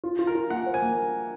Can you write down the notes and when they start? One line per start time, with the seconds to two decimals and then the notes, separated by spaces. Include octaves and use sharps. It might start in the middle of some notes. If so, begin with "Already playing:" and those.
0.04 F4
0.19 F4
0.27 A#4
0.35 F4
0.50 A#3 F#5
0.66 C5
0.74 G#5
0.82 A#3